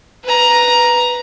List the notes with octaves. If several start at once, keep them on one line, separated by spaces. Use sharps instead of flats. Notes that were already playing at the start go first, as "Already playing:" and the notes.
B4 A#5